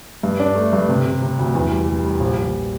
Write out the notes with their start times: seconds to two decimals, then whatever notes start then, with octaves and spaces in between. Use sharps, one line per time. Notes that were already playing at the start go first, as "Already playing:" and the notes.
0.23 G2
0.40 D4
0.55 A3
0.73 G2
0.89 C3
1.06 C3
1.22 C3
1.39 D2
1.55 E2
1.72 G3
1.88 G3
2.05 G3
2.20 A#1
2.38 A#1